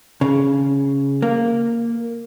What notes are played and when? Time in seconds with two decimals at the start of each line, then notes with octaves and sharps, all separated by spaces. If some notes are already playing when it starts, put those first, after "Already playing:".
0.21 C#3
1.22 A#3